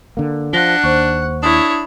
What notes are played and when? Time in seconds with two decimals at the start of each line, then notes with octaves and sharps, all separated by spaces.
0.17 D3 A#3
0.53 F3 D4 F#5 A#6 G7
0.84 D#2 C5 C#6
1.43 D4 E4 C#5 D#6